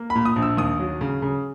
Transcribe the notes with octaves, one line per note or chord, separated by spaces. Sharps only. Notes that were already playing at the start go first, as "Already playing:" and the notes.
Already playing: A#3
B5
A#2
D#6
A#1
E6
D#2 D#6
F#3
C#3
C#3